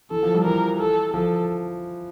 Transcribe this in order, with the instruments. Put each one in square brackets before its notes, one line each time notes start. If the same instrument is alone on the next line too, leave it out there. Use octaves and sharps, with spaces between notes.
[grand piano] E3 [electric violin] A4
[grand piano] F3
G3
[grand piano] E3 [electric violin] A#4
[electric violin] A4
[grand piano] F3 [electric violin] A4